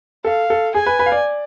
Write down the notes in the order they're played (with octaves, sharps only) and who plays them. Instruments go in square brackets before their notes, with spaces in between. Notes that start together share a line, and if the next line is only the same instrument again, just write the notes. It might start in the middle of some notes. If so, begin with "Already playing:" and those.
[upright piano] A4 [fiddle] F5
[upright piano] A4
[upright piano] G#4 [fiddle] G#5
[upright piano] B4
B4
F5
D5